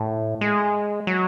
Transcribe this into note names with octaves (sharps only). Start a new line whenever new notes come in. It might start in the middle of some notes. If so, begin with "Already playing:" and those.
Already playing: A2
G#3
F#3